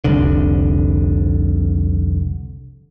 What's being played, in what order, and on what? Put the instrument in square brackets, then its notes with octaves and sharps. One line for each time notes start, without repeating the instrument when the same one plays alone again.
[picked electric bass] F1 C2 D3